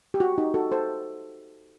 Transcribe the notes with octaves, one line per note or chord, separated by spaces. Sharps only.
G4
F#4
D#4 G4
F#4 A4
A4 C5